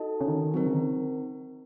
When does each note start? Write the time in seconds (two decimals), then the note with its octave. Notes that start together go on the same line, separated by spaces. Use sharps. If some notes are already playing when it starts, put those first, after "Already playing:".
Already playing: D#4 F#4 A4 D#5 A5
0.21 C#3
0.28 D#3
0.54 F#3 C4 D#4 A#4
0.66 C#3
0.74 D#3